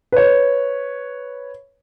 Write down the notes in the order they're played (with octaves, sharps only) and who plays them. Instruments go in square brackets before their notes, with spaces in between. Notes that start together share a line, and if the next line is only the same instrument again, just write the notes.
[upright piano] B4 C#5